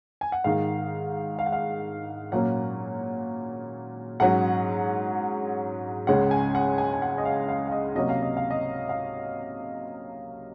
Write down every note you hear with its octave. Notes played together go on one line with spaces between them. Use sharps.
G#5
F#5
G#2 D#3 G#3 F5
F5
F#5
F5
A#2 F#3 A#3 C#4 F#5
G#2 F#3 C#4 F#5
C#2 C#3 G#3 C#4 F#5
G#5
F#5
G#5
G#5
F#5
D#5
F5
F5
F5
D#5
C3 F#3 A#3 C#4 D#5
F5
D#5
F5
D#5
F5